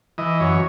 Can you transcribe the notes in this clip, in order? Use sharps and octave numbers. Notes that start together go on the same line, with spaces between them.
E3 D#5
F#2 C#5